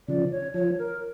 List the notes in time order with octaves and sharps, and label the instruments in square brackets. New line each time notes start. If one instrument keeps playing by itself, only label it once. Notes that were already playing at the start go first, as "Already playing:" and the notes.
[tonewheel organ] C#3 F3 [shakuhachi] D5
[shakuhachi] C#5
[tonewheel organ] F3 [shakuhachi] C#5
[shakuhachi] A#4